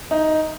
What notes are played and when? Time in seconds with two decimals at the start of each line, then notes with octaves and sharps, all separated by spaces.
0.11 D#4